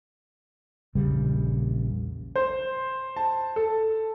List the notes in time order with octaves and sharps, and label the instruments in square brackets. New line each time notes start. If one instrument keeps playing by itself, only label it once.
[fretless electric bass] A#1 E2 C#3 G3
[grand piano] C5
A5
A4